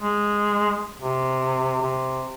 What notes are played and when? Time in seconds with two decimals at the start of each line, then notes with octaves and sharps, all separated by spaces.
0.01 G#3
1.01 C3
1.82 C3